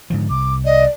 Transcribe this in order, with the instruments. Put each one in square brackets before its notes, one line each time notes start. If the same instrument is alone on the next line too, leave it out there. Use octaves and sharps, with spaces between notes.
[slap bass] G#2 D3 F3
[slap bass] C2 [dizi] D6
[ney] D5 [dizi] D#5